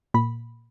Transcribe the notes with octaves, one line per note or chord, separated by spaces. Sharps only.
A#2 B5